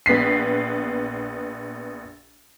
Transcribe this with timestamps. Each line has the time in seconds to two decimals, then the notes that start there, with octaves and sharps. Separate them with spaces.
0.06 A#1 B3 B6 C7